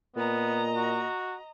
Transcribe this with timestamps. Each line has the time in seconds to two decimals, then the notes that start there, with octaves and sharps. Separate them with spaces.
0.16 A#2 B3 D#5 A#5
0.75 F#4